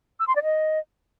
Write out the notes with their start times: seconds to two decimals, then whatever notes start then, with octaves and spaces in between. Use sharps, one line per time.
0.20 E6
0.28 C6
0.36 D5
0.44 D#5